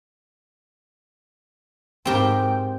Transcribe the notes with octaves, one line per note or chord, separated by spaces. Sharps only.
G#2 C4 G4 A#4 G5